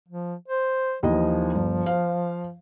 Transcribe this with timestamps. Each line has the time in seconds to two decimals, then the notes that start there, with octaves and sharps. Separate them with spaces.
0.08 F3
0.48 C5
1.03 D#2 E3 F3 D#5
1.55 G1
1.86 C5 F5